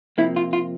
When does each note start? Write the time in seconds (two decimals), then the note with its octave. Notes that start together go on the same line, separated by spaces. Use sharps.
0.18 C3 F3 A#3 E4
0.36 F4
0.53 F4